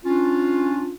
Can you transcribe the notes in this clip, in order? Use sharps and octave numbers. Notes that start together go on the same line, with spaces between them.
C#4 D4 F4